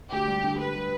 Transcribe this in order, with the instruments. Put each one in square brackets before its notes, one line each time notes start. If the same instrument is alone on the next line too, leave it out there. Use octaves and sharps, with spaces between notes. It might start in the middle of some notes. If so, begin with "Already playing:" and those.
[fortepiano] D2 [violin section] G4
[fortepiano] G3
D3
[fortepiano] G3 [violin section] B4
[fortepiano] G3